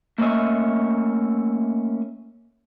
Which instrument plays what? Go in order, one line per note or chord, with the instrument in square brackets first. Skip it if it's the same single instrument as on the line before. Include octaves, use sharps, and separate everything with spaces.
[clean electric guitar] A3 A#3 C#4 D#5 E5